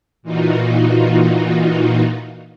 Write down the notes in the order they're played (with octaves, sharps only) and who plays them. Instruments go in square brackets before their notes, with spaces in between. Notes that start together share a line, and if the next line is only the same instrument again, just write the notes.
[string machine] A#2 E3 D#4 F4 F#4